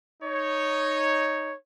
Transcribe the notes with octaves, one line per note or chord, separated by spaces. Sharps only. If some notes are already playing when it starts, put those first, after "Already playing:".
D#4 C#5